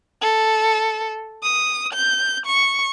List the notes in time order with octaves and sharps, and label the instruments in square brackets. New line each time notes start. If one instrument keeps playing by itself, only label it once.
[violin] A4
D#6
G6
C#6